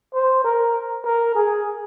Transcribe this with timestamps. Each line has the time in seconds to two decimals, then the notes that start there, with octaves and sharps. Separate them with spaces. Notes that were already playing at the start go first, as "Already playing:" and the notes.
0.14 C5
0.44 A#4
1.05 A#4
1.35 G#4